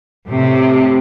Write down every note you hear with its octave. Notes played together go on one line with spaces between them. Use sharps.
A2 C3